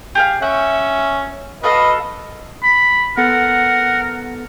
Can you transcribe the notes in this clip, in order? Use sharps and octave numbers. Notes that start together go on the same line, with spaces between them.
G4 G#4 F5
C#4 E5 F#5
F#4 A4 B4 D#5 F5
B5
B3 A4 A#4 F#5 A6